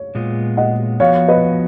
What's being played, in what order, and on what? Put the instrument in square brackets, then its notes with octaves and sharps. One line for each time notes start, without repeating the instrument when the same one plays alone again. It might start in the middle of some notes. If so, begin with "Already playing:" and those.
Already playing: [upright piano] C#5
[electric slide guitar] A#2 G#3 B3 F4
[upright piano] D#5 F#5
[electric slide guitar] F3 B3 F#4 [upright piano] C#5 F5
[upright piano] B4 D#5